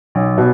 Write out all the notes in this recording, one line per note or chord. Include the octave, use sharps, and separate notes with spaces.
B1
B2